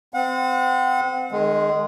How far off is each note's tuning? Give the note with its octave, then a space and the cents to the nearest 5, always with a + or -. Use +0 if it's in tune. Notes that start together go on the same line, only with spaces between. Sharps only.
C4 -30 F#5 -35
D#3 -40 G#3 +0